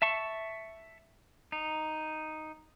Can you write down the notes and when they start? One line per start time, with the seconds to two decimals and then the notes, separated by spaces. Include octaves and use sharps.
0.02 E5 A5 C#6
1.52 D#4